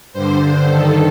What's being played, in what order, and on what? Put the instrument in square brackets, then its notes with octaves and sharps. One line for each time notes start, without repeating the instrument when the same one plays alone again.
[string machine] G2 D3 C5
G2 D#3 A4